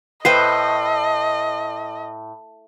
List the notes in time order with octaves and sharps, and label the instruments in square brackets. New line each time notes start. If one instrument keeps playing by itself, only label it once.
[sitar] A2 [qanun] B4 C5 G5 [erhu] D#5 [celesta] C7